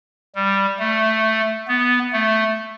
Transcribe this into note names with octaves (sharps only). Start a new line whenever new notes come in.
G3
A3
B3
A3